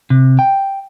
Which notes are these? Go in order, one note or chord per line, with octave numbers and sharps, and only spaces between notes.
C3
G5